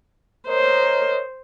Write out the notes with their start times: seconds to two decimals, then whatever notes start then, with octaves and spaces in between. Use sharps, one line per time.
0.48 A#4 C5 C#5 D#5